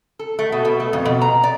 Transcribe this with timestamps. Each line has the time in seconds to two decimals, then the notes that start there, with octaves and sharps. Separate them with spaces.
0.19 A4
0.39 A3
0.52 B2
0.65 B2
0.80 A3
0.93 F2
1.05 B2
1.21 A#5
1.44 D5